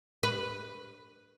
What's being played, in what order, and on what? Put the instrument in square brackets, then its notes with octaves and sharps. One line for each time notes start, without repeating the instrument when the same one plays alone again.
[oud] B4